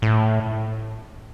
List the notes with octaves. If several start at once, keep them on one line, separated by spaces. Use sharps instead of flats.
A2